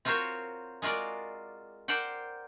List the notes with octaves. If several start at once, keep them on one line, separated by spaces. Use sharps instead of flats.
C4 F4 F#4 A#4 C5 C#5
G#3 F4 F#4 A#4 D5
A#4 C5 D5 F#5 G5